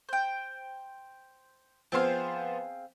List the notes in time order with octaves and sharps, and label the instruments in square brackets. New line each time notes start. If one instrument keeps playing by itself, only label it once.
[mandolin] C5 G5
[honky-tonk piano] F3 B3 C5 [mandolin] C4 G#4 F5